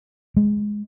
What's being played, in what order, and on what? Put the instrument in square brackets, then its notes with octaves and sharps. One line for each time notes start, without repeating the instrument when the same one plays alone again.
[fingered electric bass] G#3